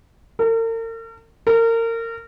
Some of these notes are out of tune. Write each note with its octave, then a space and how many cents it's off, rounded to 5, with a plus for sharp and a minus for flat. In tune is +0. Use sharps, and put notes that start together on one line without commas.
A#4 -45
A#4 -30